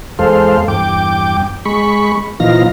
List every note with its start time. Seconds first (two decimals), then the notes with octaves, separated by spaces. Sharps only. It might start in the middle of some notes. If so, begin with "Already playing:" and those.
0.19 E2 G#3 A4 C5 F5
0.68 E2 G2 G5 D6
1.65 G#3 B5 C#6
2.40 A#2 E3 F3 D#4 F5 A#6